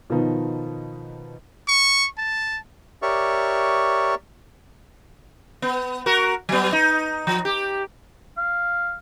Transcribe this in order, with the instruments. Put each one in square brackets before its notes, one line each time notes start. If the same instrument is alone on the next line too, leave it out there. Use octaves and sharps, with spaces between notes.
[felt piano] B2 D#3 F3 B3 D#4
[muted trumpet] C#6
A5
[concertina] G4 A#4 C#5 D5 E5 C#6
[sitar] B3
F#4 A#4
F#3 B3
D#4
F3
G4
[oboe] F5